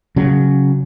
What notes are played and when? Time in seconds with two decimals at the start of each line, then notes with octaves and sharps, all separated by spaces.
0.16 C#3 F#3